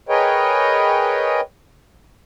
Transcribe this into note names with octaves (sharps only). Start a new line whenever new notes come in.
G#4 A#4 B4 C#5 D#5 G5